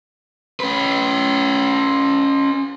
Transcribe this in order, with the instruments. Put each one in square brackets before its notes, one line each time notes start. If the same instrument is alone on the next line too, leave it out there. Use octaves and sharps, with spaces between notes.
[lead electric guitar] C#4 B4